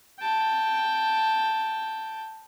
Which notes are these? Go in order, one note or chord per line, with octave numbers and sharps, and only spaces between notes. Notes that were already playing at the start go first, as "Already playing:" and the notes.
G5 A5